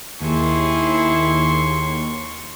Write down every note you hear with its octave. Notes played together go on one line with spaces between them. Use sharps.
D#2 E4 G#4 A5 C6 C#6